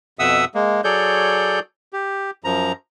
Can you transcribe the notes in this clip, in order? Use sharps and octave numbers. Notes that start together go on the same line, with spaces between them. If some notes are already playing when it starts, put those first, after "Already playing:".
F2 B2 E5 F#5 D#6 E6
G#3 A#3
F#3 G#4 A4 C#5 D5 G6
G4
F#2 F3 A#5